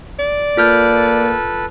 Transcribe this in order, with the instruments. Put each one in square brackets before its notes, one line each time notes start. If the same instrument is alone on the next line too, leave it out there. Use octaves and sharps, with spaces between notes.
[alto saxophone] D5
[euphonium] A#3 [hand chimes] F4 F6 G6 [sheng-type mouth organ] A4 B4